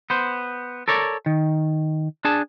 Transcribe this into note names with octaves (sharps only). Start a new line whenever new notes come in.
B3 C5
A4 A#4 C#5 D5
D#3
D4 G#4 A5